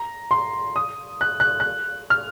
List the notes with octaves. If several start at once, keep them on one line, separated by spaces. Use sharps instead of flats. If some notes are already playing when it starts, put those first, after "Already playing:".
Already playing: A#5
C6
D#6
F#6
F#6
F#6
F6